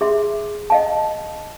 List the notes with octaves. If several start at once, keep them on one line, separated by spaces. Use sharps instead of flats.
G#4 E5 C6
D#5 F5 A5